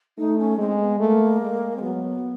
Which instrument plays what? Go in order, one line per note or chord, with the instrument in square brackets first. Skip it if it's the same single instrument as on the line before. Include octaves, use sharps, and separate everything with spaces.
[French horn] A3 [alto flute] D#4
[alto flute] C#4
[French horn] G#3 [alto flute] C4
[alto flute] B3
[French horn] A3 [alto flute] A#3
[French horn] G#3
[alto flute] C4
[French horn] F#3 [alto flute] B3